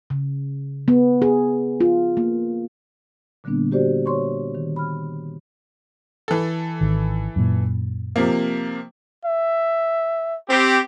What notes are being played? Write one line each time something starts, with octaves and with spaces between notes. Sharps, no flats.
C#3
B3
G#4
F4
A#3
A#2 D3 G3 A#3 B3 D4
F#4 G4 C5 D5
C#5 C6 C#6
D#3
B5 F6
E3 A4
G#1 D#3
F#2 A#2
C3 F3 A#3
E5
C4 G4